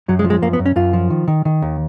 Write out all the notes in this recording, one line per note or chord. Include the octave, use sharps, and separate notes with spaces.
F#2 F#3
G#3
F3
G#3
F#2 A#3
B3
F#2
C#4
F#2 F4
F3
D#3
D#3
D#3
D#2